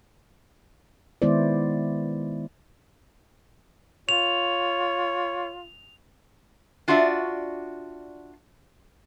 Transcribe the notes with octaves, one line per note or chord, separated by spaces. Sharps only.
D#3 G#3 B3 E4 C5 D5
F4 C#5 F7
D4 F4 F#4 D5 E5